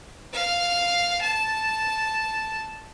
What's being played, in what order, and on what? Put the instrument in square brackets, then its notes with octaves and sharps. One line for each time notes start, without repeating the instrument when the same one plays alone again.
[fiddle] F5
A5